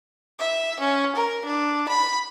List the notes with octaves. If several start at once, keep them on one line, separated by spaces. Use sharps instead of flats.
E5
C#4
A#4
D4
B5